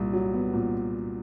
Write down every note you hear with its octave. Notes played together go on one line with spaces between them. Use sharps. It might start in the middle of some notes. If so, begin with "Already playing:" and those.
Already playing: C2 A#2
F#3
B3
A#2